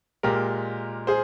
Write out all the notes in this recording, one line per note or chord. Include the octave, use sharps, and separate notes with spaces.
A#2 G#3 G4 A#4
G#4 C5